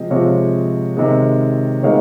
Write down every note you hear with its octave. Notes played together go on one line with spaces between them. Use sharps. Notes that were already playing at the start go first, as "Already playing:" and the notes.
Already playing: C3 F3 G#3 D#5
C3 F3 G#3 C#5 F5
C3 D#3 G#3
C3 D#3 G#3 C#5 F5